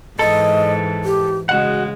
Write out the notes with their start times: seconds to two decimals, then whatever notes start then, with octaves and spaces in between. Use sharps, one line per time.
0.19 G#2 E3 A4 D#5
1.04 G4
1.49 C#3 G#3 F#4 D#5 F#5